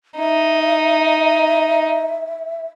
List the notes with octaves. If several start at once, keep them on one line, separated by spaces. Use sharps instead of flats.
D#4 E5